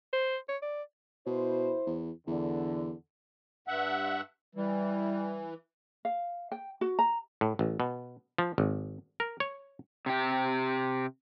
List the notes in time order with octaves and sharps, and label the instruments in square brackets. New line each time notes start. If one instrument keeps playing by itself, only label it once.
[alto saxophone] C5
C#5
D5
[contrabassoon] B2 [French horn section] E4 C5
[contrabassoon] E2
[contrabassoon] E2 [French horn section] D3
[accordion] G2 E5 F#5
[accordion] E3 [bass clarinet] G3
[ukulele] F5
G5
F#4
A#5
[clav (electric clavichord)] A2
A1
B2
F3
G#1
A#4
C#5
[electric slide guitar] C3 G4